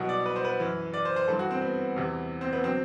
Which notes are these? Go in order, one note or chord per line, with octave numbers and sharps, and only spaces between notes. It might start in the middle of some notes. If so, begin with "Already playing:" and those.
Already playing: C2 B2 F#3 F#4
D5
B4
C5
B4
F#2 E3
D5
C5
C5
G2 E3 A4
F#4
C4
B3
E2 C3 E3
C4
B3
D3 F#3 C4